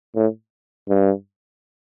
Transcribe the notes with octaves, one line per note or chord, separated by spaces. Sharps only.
A2
G2